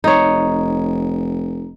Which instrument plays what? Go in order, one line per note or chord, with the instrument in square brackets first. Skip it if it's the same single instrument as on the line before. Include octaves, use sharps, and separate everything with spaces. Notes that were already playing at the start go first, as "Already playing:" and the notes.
[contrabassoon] F1 [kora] D#4 C#5